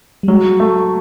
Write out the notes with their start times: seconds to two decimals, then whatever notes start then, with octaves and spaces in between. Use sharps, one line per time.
0.23 G3
0.28 F#3 G#3
0.60 A3